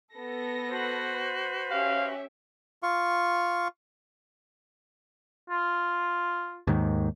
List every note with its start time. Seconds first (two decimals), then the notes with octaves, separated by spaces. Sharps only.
0.15 B3 A4 A#6
0.70 F#4 B4 C5
1.71 C#4 G4 E5 F5
2.83 F4 F5 C#6
5.50 F4
6.67 D#2 G#2 D#3